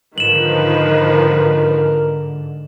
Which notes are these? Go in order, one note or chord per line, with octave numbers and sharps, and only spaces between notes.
G#2 D3 D#3 F3 A#4 B4 E7 F#7